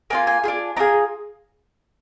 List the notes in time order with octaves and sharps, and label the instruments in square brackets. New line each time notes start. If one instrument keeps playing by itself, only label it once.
[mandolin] A#3 D4 F4 G#5
G#5
D4 F4 G#4
D4 F4 G#4 A#5